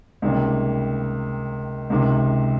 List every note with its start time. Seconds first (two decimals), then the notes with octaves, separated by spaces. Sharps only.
0.22 C#2 C3 D#3 G3 A#3
1.90 C#2 C3 D#3